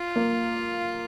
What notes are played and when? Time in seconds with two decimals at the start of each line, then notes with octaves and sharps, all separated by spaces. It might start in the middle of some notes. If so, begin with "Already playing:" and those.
Already playing: F4
0.16 A#3